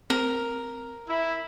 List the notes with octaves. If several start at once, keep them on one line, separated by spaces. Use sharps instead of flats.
C4 A#4
E4